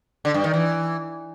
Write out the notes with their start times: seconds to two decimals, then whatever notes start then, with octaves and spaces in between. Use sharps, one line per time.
0.25 D3
0.34 G2
0.44 D#3
0.54 E3